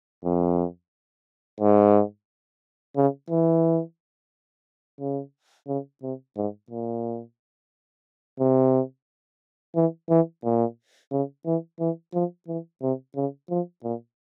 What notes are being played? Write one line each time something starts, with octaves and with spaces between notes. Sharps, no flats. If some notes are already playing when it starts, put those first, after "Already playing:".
F2
G#2
C#3
E3
C#3
C#3
C3
G#2
A#2
C3
E3
E3
A#2
C#3
E3
E3
F3
E3
C3
C#3
F3
A#2